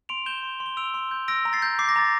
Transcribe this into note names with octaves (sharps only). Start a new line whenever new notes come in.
C6 D7 F7
G6 E7 G7
C6
C6
G7
E6 D7 F7
C6
G6
E6 A#6 D7
A#5
A6 C7
G6
D6 C7
A#6
A#5 A6